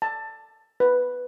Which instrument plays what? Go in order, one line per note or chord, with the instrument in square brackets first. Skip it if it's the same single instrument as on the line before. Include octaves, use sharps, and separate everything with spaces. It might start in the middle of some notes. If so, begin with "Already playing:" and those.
[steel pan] A5
B4